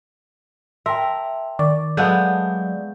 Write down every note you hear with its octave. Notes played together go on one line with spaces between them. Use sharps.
A#4 E5 G5 A5 C6
D#3 D5 C#6
F#3 G#3 A3 B3 F5 G6